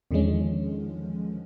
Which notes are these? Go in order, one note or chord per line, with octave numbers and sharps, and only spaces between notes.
E2 D3 D#3 F3 G#3 C#4